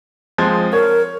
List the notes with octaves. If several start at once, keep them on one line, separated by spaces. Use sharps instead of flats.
F3 G#3 C4
A#4 C#5